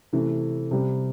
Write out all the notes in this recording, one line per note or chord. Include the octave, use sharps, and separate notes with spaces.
C3 E3 A3
C3 G3